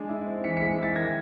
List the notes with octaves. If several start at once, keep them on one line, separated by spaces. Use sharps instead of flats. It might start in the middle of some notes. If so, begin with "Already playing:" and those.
Already playing: G#3 D4
E4
C4
E3 B6 C#7
B6 C#7
G#3
E4 A6 B6
D#3 G#6 A#6